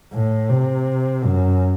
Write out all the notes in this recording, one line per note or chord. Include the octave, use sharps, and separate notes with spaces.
A2
C3
F#2